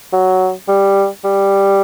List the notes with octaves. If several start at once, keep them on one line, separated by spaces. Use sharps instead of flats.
F#3
G3
G3